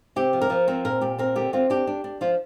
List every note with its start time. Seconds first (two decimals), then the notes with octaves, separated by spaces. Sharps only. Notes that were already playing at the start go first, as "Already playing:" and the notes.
0.16 C3 G4
0.33 F3
0.41 A#4
0.50 F3
0.68 C4 A#4
0.85 A#2 A#4
1.01 A#2 G4
1.19 C4 A#4
1.36 D3 G4
1.53 C4 F4
1.70 D4 G4
1.87 D4
2.04 D4
2.21 F3 F4